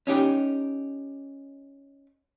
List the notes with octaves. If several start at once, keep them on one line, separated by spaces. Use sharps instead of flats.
C#4 D#4 G4